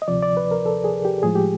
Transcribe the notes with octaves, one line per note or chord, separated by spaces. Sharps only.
D#5
D2 C3 F3 D5
D5
B4
A#4
A4
G#4
G4
A2 F3 G#3 G#4
G4